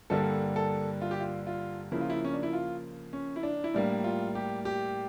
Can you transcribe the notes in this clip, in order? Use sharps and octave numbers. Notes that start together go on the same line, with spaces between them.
G2 D3 G3 A#3 A4
A4
F4
G4
F4
F4
C#3 F3 A#3 E4
F4
E4
C#4
D4
E4
F4
C#4
E4
D4
E4
A2 G3 A#3 D4
F4
G4
G4